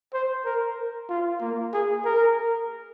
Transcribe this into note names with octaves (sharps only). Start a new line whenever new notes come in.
C5
A#4
F4
A#3
G#4
A#4